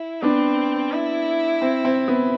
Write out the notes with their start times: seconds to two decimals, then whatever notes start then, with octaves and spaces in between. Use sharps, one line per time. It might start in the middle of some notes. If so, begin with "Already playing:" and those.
Already playing: E4
0.22 B3 C4 D4
0.92 E4
1.62 C4
1.85 C4
2.08 B3